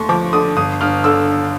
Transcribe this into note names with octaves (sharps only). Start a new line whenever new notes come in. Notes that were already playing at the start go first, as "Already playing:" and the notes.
Already playing: D#2 A3 C6 C#6
F3 D6
D3 D#6
G1 D#6
G1 F6
D3 E6